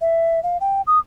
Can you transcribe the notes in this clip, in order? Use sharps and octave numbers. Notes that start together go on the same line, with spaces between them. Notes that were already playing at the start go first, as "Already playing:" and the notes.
E5
F5
G5
D#6